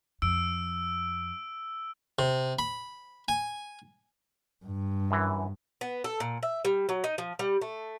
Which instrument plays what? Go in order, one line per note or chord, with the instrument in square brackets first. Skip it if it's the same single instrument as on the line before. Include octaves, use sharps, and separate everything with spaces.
[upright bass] F2 [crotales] E6 D7
[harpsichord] C3
B5
G#5
[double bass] G2
[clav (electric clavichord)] F#2 E3
[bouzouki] B3
A4
A#2
E5
G3
F#3
D#4
F3
G3
A3